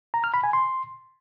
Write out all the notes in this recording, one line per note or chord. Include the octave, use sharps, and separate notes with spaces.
A#5
F6
B5
G#5
C6